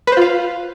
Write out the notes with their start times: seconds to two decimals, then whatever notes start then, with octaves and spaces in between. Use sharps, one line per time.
0.07 B4
0.12 C5
0.17 F4
0.22 F5